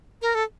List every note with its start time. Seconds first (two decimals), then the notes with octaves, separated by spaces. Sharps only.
0.22 A#4
0.35 A4